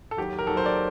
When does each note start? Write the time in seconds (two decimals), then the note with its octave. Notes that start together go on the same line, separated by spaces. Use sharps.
0.11 A4
0.17 D#2 D#3 F#3 G4
0.39 A#4
0.47 D#2 D#3 F#3 A4
0.57 C5
0.66 D5